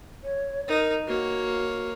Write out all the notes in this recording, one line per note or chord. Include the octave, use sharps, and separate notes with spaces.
C#5
D#4 A#4
A#3 F#4 C#5